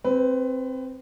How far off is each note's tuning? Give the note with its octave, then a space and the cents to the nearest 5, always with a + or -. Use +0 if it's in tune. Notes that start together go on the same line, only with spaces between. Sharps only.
C4 +0 B4 +20